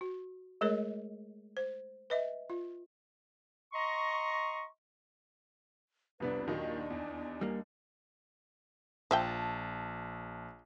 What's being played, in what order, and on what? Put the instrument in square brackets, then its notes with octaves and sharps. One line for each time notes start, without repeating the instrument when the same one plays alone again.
[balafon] F#4
G#3 A3 G#4 A#4 C#5 D#5
C5
B4 D#5 E5
F4
[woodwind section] D#5 A#5 C6 C#6
[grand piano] C2 B3 D4 [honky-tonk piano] F2 C3 [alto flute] B4
[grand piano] D#2 D#4 [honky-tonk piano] A#2 D#3 F#3 [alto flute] D4
[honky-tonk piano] E2
[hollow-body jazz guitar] G3 A#3
[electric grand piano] A#1 A5 [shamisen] F3 E5 G5